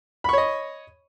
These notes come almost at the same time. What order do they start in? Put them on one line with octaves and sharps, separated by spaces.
B5 C#6 C#5 D#5